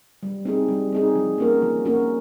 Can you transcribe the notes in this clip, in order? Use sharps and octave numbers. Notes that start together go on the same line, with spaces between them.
G3
C4 D#4 G#4
G3
C4 D#4 G#4
F3
A#3 C#4 F#4 A#4
F3
A#3 C#4 F#4 A#4